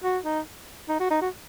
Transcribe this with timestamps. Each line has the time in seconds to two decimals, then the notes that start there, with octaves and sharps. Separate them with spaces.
0.03 F#4
0.25 D#4
0.89 D#4
1.00 F#4
1.11 D#4
1.21 F#4